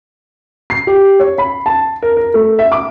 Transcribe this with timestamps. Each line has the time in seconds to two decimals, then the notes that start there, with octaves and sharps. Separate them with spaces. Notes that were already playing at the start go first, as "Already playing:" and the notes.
0.70 C7
0.87 G4
1.20 C#5
1.38 B5
1.66 A5
2.02 A#4
2.17 A#4
2.34 A3
2.59 E5
2.72 D6